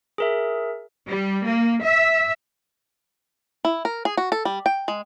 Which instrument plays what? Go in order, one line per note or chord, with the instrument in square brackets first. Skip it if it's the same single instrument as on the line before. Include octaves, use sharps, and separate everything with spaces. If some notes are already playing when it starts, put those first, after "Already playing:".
[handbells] G#4 A#4 E5
[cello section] G3
A#3
E5
[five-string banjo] E4
A#4
G#4
F#4
A4
G3
G5
G#3